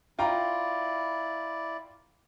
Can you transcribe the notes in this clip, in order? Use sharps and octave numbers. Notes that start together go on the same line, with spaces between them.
E4 F4 D5 G5 A#5